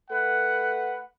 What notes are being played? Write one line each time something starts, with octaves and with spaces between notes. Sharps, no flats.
A3 B4 F#5